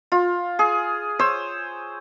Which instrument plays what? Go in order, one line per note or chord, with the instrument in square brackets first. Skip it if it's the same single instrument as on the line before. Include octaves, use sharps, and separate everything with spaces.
[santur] F4
G#4
C5 C#5 E6